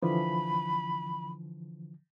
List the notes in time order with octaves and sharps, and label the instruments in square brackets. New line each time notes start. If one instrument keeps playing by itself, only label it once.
[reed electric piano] D3 E3 F3 [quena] B5